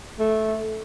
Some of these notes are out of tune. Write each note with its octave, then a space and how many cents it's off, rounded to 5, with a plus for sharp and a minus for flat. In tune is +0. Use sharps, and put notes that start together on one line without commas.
A3 -10